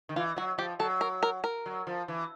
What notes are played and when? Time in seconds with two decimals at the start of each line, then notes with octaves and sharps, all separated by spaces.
0.09 D#3
0.16 E3 F4
0.36 F#3 F#4
0.58 F3 G4
0.79 F#3 A4
1.01 A#4
1.23 A#4
1.44 A#4
1.66 F#3
1.87 F3
2.08 E3